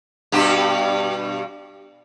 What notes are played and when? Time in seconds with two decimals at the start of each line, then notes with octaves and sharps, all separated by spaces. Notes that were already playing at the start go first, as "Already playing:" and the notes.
0.32 G2 B2 G4